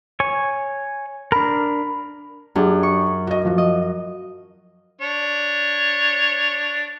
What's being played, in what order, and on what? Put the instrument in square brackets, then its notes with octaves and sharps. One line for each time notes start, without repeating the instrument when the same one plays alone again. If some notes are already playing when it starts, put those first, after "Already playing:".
[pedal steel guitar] C#5 G#5 C#6
[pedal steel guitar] D4 A#4 [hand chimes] B5
[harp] F#2 [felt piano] D4 G4 G#4
[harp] C#6
[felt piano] F#4 D#5
F3 F#4
[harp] D#5
[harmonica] D4 C#5